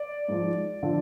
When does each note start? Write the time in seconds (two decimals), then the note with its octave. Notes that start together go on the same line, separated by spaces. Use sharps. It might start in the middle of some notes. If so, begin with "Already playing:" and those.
Already playing: D5
0.28 G#2 F3
0.83 D3 F3